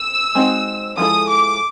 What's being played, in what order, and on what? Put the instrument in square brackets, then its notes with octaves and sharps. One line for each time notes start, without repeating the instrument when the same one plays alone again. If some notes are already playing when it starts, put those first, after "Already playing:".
Already playing: [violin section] E6
[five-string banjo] G#3 C4 D#4 F#4
[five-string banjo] F3 G#3 B3 E4 A4 [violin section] D#6
[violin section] D6